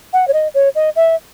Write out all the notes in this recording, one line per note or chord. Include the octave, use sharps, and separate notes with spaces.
F#5
C#5
D#5
C#5
D#5
E5